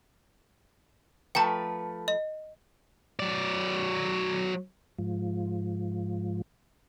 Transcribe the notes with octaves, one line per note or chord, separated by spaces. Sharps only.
F3 A3 B4 G5 A#5
D#5
F#3 D5
G#2 F3